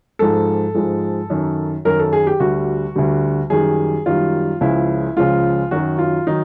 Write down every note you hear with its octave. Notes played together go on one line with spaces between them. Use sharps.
G#2 F3 G#3 A4
G#2 F3 G#3
F#2 D#3 F#3
F#2 D#3 F#3 A#4
A4
G#4
G4
D2 D3 G3 F#4
D2 D3 G3
F#2 D#3 G3 G#4
F#2 D#3 G3 F4
C#2 C#3 F3 G#3 E4
C#2 C#3 F3 G#3 F4
F#2 D#3 F#3 F#4
F4
D#3 F#3 D#4